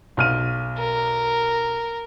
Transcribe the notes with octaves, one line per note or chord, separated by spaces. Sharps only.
B1 F6 D#7
A#4